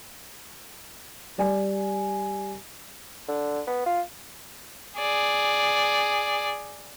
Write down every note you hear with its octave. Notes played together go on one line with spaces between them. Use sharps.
G3 D5 G#5
D3
B3
F4
G#4 D5